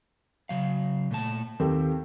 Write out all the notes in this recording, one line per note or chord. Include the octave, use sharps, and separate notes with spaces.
C#3 F#3 F5
A#2 A3 A5
D#2 C4 G4 A4